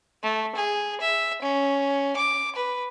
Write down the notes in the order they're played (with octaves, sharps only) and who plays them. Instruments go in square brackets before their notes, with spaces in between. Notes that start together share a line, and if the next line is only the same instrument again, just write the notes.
[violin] A3
G#4
E5
C#4
D6
B4